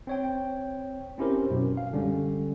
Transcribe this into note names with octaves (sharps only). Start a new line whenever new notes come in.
C4 C#5 G5
C4 C#4 E4 G4 A#4 C5
F#2 B2
F5
D3 G3 G#3 C#4